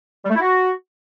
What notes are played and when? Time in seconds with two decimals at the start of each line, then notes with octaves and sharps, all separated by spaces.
0.25 G3
0.30 A3
0.35 E4
0.40 F#4